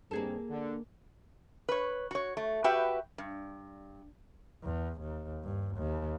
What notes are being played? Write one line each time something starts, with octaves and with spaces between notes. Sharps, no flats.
G2 D#3 A#3 C4 G#4 A4
D3
B4 C#5
F#4 C#5
A3
F#4 G4 B4 E5 G5
G2
E2
D#2
G2
D#2